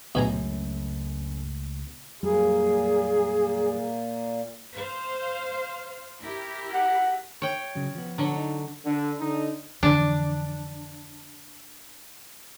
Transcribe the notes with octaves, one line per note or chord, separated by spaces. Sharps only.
C#2 F#2 B2 G#3 A3 G#5 A#5
F2 A#2 F#3 G3 A#3 G#4
C5 F5
E4 G4 A#4
F#5
C#5 G5
C#3 F#3
F3 B3
D3 F#3
D#4
D3
D3 D#4
F2 D3 E3 D4